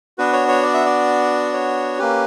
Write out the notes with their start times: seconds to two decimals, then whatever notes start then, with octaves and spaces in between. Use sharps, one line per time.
0.18 B3 D4 F#4 B4
0.33 C#5
0.48 C#5
0.63 D5
0.74 E5
0.86 D5
1.53 C#5
1.99 A#3 C#4 G4 B4